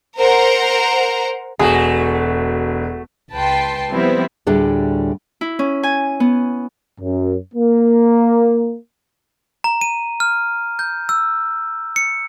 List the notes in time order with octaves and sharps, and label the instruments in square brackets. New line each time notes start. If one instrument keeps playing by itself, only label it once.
[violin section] A#4 C5 F#5 A#5
[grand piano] E1 [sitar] A3 F#4 [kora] G#4
[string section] C#2 B4 G5 A5 C6
F3 G3 B3 C4 E4
[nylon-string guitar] D2 A2 G3 D4 G#4 A4
[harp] E4
C#4
G#5
B3
[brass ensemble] F#2
A#3
[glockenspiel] A#5
D#7
F6
G6
E6
C#7